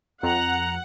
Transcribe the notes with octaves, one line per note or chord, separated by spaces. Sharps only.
F2 F#5 A#5